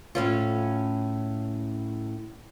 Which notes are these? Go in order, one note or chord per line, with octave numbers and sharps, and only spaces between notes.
A2 C#4 F4